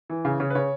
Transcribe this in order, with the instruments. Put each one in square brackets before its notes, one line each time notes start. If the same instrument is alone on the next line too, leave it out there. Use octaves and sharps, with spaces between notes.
[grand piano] E3
C#3
C#3 C#5
B4
C#3 C#5